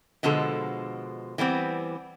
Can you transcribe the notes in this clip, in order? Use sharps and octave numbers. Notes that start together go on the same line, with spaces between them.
B2 D3 F3 G#3 A4
E3 G3 B3 C4